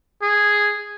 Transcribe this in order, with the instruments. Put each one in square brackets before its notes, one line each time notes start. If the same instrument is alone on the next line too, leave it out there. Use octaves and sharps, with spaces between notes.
[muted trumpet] G#4